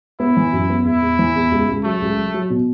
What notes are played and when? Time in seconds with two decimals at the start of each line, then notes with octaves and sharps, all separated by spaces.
0.20 B3 E4
0.37 E3
0.53 F#2
0.70 B3
0.85 E2 E4
1.02 E2
1.19 E3
1.36 E2
1.51 C#2
1.68 C#2
1.84 F#3 A3
2.02 C#2
2.18 F#3
2.34 F#3
2.50 B2